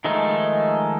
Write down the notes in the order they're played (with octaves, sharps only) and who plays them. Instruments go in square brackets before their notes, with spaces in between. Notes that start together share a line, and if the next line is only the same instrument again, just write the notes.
[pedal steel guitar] D#3 F3 G#3 A3 D#4